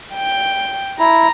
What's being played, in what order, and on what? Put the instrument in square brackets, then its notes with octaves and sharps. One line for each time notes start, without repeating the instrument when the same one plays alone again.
[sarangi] G5
[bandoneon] E4 [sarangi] A#5